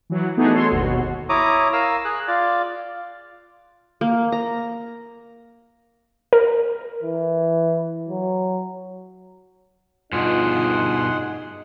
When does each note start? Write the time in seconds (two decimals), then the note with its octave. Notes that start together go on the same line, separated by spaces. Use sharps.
0.10 E3 F#3
0.37 A3 B3 D4 D#4 F#4 G#4
0.53 A4 C#5 C6
0.70 G1 D#2 B2 F#4
1.29 E4 C#5 A#5 D6 D#6
1.73 A#4 F5 E6
2.05 G#4 F#6
2.28 F4 D5
4.01 A#3
4.32 A#5
6.33 A#4
7.03 E3
8.09 F#3
10.13 G2 B2 D#4 F4 G#4 F#5 C6